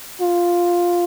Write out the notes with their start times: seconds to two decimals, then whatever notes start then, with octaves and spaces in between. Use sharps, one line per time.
0.21 F4